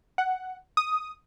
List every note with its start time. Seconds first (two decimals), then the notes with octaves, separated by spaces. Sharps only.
0.18 F#5
0.77 D#6